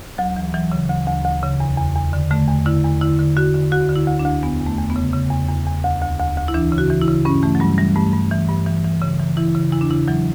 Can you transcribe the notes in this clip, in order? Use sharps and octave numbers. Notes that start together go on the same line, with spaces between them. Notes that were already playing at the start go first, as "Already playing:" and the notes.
D2 F#3
E3
E3 F#3
C#3
D2
D2
D2
C#3
E2
E2
E2
D3
D3 A3
E2
D3 E4
E2
D3 E4
D3
D3 F#4
D3
D2 F#4
D3
E4
D2
D4
D2
E2 B3
E2
A3
E2
B3
C#3
C#3
E2
E2
E2
D2
D2
D2
D2
E4
E3 D4
C#3
F#4
E3
E4
C#3
G2 C#4
E3 A3
F#3
G2 G3
E3 G3
G2 A3
G2
E3
G2
E3
E3
C#3
E3
E3 E4
C#3
E2 E4
D4
C#3 E4
E3 F#3